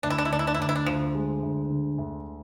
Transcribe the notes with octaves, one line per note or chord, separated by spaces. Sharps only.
D2 D4
E4
D4
E4
D2 D4
E4
D4
E4
D2 D4
E4
D4
D2 F3
G#3
D2
D3
D2